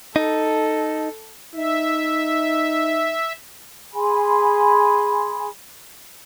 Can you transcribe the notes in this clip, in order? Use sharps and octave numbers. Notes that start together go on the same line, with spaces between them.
D#4 A4
D#4 E5
G#4 G#5 B5 C6